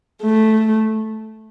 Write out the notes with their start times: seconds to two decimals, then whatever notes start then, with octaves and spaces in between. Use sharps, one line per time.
0.23 A3